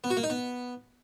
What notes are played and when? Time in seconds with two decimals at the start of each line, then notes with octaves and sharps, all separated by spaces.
0.04 B3
0.10 F#4
0.17 A#3
0.23 D#4
0.30 B3